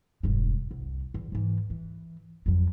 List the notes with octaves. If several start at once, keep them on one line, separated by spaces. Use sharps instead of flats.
E1 G2
C2
E2
G#2 E3
E3
F2 F#3